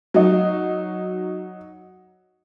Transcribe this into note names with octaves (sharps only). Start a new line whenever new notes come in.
F#3 D#4